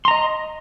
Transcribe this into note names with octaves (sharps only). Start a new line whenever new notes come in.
D#5 A#5 C6